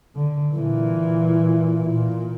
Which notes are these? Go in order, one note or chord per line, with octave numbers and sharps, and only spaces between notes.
D3
A#2 E3
A#2